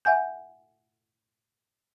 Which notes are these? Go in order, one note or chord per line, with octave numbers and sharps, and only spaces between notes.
E5 F#5 G#5 G6